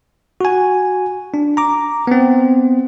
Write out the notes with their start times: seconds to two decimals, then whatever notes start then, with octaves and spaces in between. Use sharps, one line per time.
0.41 F#4 G#5
1.34 D4
1.57 A#5 D6
2.07 B3 C4